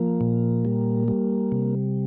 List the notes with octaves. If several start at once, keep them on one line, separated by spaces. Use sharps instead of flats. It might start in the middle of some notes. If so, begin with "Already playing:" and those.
Already playing: F3 A#3
A#2
G3
G3
C3